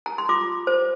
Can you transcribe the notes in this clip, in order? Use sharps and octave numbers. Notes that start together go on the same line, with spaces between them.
A#5
C6
F4 D6
C5